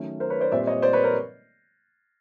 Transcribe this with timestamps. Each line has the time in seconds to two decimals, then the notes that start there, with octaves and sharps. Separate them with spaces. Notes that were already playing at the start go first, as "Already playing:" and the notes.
Already playing: D#3 F#3 A3 C#4
0.20 A#4 C5
0.30 B4 C#5
0.41 C5 D5
0.52 A#2 G3 C4 D5 E5
0.67 C#5 D#5
0.82 C5 D5
0.93 B4 C#5
1.04 A#4 C5